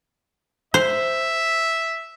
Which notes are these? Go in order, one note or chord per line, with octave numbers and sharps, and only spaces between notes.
C5 E5